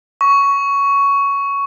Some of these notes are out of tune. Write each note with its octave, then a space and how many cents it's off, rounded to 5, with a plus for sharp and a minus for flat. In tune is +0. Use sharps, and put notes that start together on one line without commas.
C#6 +10